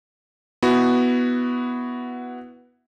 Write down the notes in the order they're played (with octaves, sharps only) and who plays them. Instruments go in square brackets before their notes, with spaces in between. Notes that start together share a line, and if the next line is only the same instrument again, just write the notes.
[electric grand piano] B3 E4 F#4